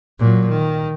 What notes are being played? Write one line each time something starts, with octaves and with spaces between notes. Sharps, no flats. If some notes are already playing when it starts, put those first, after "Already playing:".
A#2 F#3
D#3